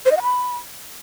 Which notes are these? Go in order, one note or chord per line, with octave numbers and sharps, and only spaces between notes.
C5
D#5
F#5
B5